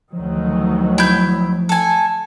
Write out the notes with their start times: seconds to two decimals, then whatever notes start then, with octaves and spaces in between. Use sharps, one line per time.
0.12 D2 D#3 F3 F#3
0.98 E4 G6
1.69 A4 G#5